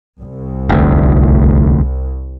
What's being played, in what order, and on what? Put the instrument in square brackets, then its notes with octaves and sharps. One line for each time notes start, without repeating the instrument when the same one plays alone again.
[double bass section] C2
[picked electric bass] F1 D2